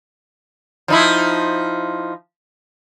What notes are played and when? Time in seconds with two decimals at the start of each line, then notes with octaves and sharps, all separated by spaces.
0.88 F3 D#4 E4